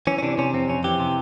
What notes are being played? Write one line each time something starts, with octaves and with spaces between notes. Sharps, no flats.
E3 C#4
C#4
C3 D4
C3 C#4
F2 C4
F2 C#4
E3 G4
C3